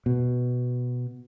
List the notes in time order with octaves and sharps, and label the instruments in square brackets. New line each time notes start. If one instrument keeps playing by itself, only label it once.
[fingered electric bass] B2